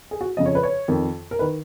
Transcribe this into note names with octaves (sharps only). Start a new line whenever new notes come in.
G#4
F#4
F2 C#3 F3 D#5
C#5
B4
C#5
F2 D#3
A#4
D#3 B4